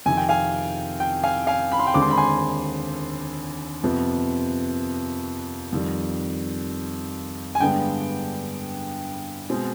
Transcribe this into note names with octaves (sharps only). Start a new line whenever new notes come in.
F2 C3 D#3 G#5
G5
F5 G#5
G5
F5 G#5
F5 G#5
B5
C6
G5 B5
D#2 D3 G#3 C4 D6
C6
B5
G#5 C6
F2 C3 F3 B3
F2 D#3 G3
G#5
G2 D3 G#3 B3 G5
B2 G#3 C4